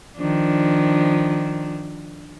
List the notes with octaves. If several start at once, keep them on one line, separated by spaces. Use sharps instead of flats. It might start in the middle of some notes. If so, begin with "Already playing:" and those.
D#3 F3 D4